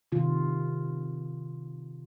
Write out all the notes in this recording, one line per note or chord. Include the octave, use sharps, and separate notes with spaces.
C3 D#3 F4